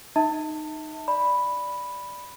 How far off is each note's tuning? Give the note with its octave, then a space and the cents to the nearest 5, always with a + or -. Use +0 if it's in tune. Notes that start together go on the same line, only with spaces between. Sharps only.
D#4 -15 E5 -40 A5 +30
D5 +0 B5 +0